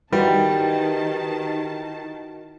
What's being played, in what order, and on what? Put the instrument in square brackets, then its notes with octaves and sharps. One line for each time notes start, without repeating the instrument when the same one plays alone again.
[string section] D#3 A5 [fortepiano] G3 [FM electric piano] E4 F#4 [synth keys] G4 A#4 B4